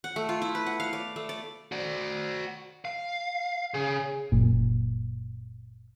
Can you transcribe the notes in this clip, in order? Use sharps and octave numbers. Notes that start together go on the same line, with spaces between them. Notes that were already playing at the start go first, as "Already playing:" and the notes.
F#5
A3
F4
E4
B4
F#5
F5
D5
A3
D5
F#4 D5
F5
C#3 G#4
F#1 A#2